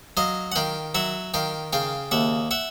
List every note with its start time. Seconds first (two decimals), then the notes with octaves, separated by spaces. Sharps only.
0.17 F#3 D#5 F5
0.52 F#5
0.55 D#3 F5 G5
0.95 F#3 E5 F#5
1.34 D#3 F5 G5
1.73 C#3 F5 G5
2.11 D#2 E5 F#5
2.51 E5 F#5